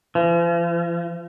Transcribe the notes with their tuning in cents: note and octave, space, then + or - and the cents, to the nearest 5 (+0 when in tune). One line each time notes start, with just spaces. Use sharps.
F3 -45